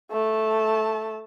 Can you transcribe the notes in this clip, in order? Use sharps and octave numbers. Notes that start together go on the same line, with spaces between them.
A3 A5